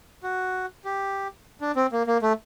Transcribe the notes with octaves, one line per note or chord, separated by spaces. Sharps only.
F#4
G4
D4
C4
A#3
A#3
A3